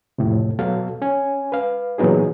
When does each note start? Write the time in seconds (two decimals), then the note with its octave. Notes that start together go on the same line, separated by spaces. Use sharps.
0.18 F2 A2 C3
0.59 B2 F#3 A4 F5
1.02 C#4 G#5
1.52 B4 F5
1.98 A#2 E3 F#3 B3 D#4 G#4